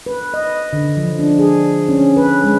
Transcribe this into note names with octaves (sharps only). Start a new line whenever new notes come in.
B4
D#5
D3
F3
D4
G#4
C#4
B4
G#3